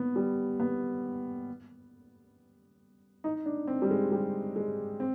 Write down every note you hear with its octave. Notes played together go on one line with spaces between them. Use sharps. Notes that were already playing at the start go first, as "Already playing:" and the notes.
Already playing: B3
G3
B3
D#4
D4
C4
G3
G#3
G3
G#3
C4